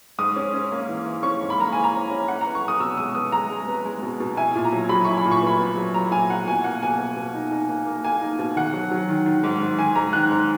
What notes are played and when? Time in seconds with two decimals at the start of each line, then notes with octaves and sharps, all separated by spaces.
0.18 G#2 D#6
0.36 C#4
0.53 C#4
0.72 A#3
0.88 E3
1.06 E3
1.23 C#4 C#6
1.41 G#2
1.50 B5
1.58 A#3 A#5
1.73 E3 G#5
1.84 A#5
1.94 C#4
2.11 C#4
2.28 E4 F#5
2.41 A#5
2.46 B3
2.55 C#6
2.63 B3 D#6
2.80 B2 E6
2.97 G#3 D#6
3.15 B3 D#6
3.32 G#3 A#5
3.51 G#3
3.68 B3
3.85 G#3
4.03 B2
4.20 B2
4.37 E4 G#5
4.56 A#2
4.64 A#5
4.73 F#3
4.89 F#3 B5
5.05 E4 C#6
5.17 B5
5.25 A#2
5.31 C#6
5.42 B3 B5
5.59 B3
5.77 F#3
5.94 F#3 A#5
6.11 A#2 G#5
6.30 E4 F#5
6.48 B2 G#5
6.64 A#3 F#5
6.83 B2 G#5
6.99 B2
7.17 B2
7.34 D#4
7.51 D#4
7.69 A#3
7.86 A#3
8.04 A#3 G#5
8.22 D#4
8.39 B2
8.56 D#3 F#5
8.73 F#3
8.91 F#3
9.09 D#3
9.26 D#3
9.43 G#2
9.61 G#2
9.79 D#3 G#5
9.95 G#2 A#5
10.13 D#3 F#6
10.30 G#2